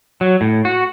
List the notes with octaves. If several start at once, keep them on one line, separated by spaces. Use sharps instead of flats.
F#3
A2
F#4